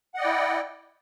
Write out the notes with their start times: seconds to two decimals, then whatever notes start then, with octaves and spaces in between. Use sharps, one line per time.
0.14 F#5
0.17 D#5
0.20 D5
0.22 G5
0.25 E4